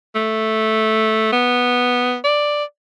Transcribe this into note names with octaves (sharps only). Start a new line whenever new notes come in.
A3
B3
D5